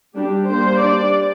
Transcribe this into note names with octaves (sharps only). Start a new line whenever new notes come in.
G3 D4 G4
G3 A#3 D4 C5
G3 D4 D5